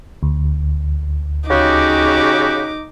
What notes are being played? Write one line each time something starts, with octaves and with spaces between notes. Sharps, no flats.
D2
C#3 D#4 F#4 G4 D6